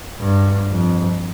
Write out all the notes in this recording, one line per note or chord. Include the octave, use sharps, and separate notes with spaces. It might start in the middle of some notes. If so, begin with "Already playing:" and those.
G2
F2